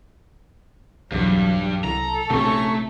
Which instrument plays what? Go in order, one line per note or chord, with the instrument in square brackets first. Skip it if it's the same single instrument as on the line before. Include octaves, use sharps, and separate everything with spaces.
[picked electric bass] B1 E2 [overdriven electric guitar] G2 [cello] F#3
[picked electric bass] C2 [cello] A4 [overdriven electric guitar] A#5
[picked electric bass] A#1 C3 [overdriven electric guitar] A3 [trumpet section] C#4 A#5 C#6